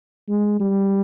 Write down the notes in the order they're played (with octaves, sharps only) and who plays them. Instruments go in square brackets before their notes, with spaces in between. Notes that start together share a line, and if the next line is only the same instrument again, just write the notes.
[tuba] G#3
G3